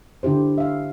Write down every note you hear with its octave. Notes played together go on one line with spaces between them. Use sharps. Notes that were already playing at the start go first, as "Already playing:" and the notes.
D3 D4 E4 G4 C5
E5 F5